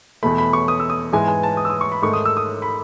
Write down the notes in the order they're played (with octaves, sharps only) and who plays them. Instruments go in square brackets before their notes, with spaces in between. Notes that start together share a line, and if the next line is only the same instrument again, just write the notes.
[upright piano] E2 B2 A3 B5
B5
C#6
D#6
E6
D#6
G#2 E3 G#3 B3 G#5
G#5
A5
D#6
E6
D#6
C#6
B5
G#2 D#3 A3 C#6
D#6
E6
D#6
B5